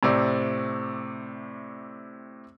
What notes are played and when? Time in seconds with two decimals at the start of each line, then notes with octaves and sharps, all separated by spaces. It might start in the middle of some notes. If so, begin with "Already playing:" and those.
0.03 A2 C3 C4 D5